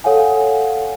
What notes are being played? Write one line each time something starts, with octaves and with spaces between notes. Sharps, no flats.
A4 C#5 F5 F#5 G#5